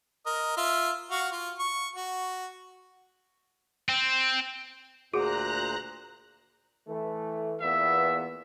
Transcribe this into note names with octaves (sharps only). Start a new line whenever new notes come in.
A#4 D#5
F4 E5
F#4 F5 C#6
F4
C#6
F#4
C4
D2 A#2 F#4 G#4 C5 F#5 A#5 F#6
E3 A3
E2 A#2 B3 E5